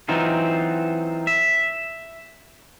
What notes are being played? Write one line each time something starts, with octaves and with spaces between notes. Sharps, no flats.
E3 F#3 C4 D#4 F4
E5